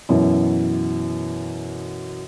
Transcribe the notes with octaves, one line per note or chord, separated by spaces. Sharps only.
F#2 B2 E3